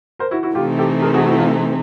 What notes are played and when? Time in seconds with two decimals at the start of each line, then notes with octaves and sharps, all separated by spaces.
0.19 A#4 C5
0.31 E4 F#4
0.43 E4 F#4
0.55 C3 E3 A3 C4 D#4 F4 G4
0.79 G4 A4
1.02 G#4 A#4
1.14 F#4 G#4
1.26 E4 F#4
1.38 F4